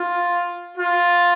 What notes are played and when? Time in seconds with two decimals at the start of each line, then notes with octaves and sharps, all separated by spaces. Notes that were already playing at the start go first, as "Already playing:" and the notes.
Already playing: F4
0.77 F4